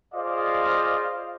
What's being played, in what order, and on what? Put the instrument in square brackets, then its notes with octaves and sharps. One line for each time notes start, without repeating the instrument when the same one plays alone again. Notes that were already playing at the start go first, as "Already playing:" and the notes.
[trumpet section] F4 G#4 C5 D5 D#5 F5